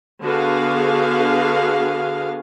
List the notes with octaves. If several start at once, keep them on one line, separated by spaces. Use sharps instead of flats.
D3 B3 F#4 G#4 F5